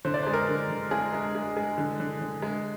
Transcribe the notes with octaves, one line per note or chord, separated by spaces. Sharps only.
D3 C5
D5
G#3 C5
A#4
D3
D3
G#3 G#4
G#3
G#3
G#3
D3
D3
D3
G#3